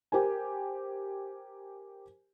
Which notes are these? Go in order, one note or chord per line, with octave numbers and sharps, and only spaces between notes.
G4 A#4 C5 G#5